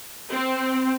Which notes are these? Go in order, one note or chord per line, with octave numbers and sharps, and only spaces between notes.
C4